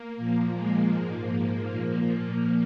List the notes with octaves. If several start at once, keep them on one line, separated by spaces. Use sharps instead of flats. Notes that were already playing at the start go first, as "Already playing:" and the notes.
Already playing: A#3
A#2 F3
G#3
G#2 F3 A#3
A#3
A#2 F3